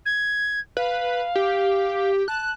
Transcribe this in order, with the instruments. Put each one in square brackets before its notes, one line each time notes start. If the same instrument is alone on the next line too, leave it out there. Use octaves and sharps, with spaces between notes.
[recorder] G#6
[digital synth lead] B4 [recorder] F5
[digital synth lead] G4
[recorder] A5 [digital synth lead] F#6